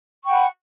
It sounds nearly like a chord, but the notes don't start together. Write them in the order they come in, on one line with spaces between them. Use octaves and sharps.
C#6 G5 F#5 B5